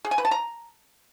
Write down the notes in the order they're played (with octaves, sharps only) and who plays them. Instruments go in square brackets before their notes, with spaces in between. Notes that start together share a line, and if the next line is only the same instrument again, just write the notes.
[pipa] G#4
G#5
B4
A5
A#5